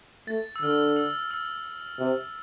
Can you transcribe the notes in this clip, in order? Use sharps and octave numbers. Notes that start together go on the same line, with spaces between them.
A3 A6
E6
D3 F6
E6
E6
C3